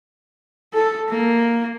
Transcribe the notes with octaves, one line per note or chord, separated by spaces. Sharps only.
A4
A#3